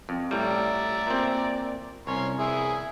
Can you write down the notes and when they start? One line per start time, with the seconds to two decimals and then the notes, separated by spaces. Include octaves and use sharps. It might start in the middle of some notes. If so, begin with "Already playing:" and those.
0.09 F2
0.31 A2 G3 D5 E5 A#5
1.07 A#2 C4
2.07 C2 C#4 C#5 C6
2.39 E4 G#4 E5